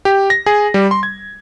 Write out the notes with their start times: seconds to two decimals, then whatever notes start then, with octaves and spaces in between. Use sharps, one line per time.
0.05 G4
0.30 A#6
0.46 G#4
0.74 G3
0.91 C6
1.03 G#6